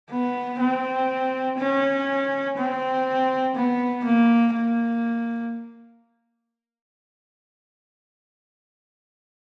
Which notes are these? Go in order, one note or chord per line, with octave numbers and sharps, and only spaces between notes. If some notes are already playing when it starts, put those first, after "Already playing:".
B3
C4
C#4
C4
B3
A#3
A#3